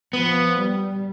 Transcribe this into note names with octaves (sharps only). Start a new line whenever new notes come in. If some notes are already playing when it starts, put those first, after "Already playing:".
F3 B3
G3